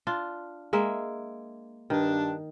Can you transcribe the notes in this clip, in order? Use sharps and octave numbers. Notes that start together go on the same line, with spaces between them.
D4 F4
G#3 A#3 E5
G2 D#3 D4